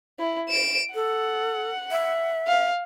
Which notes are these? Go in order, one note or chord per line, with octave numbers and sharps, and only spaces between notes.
E4
D7 E7
A4 F#5
E5
F5